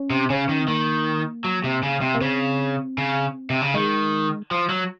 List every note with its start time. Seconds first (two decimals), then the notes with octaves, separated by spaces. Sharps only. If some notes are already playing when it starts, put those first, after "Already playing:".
Already playing: C#4
0.10 C3
0.30 C#3 C#4
0.49 D#3
0.60 C4
0.68 D#3 A#3
1.44 F#3
1.64 C3
1.83 C#3
2.01 C3
2.15 A#3
2.21 C#3 C4
2.98 C#3
3.50 C3
3.62 C#3
3.74 D#3 G#3
4.51 F3
4.69 F#3